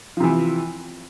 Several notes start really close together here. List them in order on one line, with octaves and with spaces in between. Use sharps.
F3 C3 E3